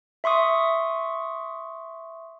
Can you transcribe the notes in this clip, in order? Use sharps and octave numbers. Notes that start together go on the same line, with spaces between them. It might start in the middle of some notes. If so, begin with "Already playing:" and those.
E5 C6 C#6 D#6